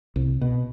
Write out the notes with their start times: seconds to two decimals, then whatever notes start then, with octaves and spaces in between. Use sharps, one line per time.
0.16 C2
0.41 B2